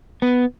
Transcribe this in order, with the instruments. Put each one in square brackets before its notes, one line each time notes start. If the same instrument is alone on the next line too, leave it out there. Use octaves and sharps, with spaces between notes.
[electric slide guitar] B3